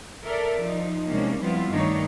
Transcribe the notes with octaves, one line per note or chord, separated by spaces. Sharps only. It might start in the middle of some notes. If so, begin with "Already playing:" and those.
A4 A#4 D5 E5
F3 D#4
C3 G#3 A#3 C#4 D4
F3 G3 B3 C4 E4 F4
G2 D#3 A3 D4 D#4 C#5